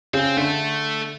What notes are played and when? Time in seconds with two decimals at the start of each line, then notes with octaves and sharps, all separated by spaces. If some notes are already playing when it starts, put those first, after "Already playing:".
0.14 C#3 C4
0.37 D3 A3